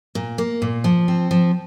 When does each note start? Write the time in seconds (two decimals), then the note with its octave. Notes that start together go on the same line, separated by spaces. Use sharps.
0.15 A#2
0.38 A#3
0.62 A#2
0.84 F3
1.08 C4
1.31 F3